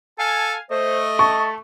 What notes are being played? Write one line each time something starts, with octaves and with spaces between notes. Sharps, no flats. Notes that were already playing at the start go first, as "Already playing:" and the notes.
A4 F5 G#5 A5
A3 C5 D#5
A5 C#6